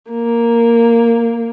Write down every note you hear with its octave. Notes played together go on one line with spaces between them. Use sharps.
A#3